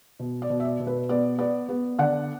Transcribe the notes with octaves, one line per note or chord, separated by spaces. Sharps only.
B2
D5
B2
E5
D5
B2
B4
B3 D5
B3 D5
B3
D3 D5 F#5